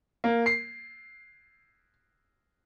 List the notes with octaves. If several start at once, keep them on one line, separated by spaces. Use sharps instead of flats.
A#3
C7